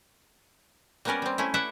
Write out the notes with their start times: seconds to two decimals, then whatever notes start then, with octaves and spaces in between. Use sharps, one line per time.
1.05 G3 A#3 B3 C#4 A#4 D5
1.22 G3 C4
1.38 A3 C#4 E4
1.54 A4 B4 D5 E5 F#5